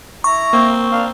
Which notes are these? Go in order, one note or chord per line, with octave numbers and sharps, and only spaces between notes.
E4 A#5 C#6
A#3 C4
D4 A#4 F5